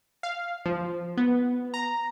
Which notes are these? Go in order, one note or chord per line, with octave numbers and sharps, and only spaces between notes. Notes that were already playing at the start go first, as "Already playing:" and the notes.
F5
F3
B3
A#5